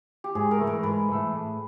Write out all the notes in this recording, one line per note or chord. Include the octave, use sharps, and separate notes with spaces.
G4
G#2 G#4
A#4
E3 A3
A#4
G#2 B4
E3 A3
A2